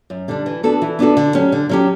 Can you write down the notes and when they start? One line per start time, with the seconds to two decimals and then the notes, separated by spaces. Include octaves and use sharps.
0.10 F#2
0.28 D3 G3 D4
0.46 E3
0.63 B3 D4 F#4 A4
0.82 E3
0.99 B3 D4 F#4 A4
1.17 D3
1.35 F#3 C#4 G4
1.52 D3
1.69 F#3 C#4 G4